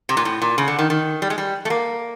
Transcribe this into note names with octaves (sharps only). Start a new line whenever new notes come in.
C3
A#2
A2
A#2
C#3
D3
D#3
D#3
G3
G#3
G3
A3
A#3